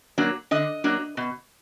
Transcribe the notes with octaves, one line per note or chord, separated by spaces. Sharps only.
F#3 A#3 D4
D3 D#5
F#3 A#3 D4
B2